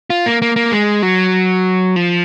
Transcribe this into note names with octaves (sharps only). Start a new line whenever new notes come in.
F4
A#3
A#3
A#3
G#3
F#3
F3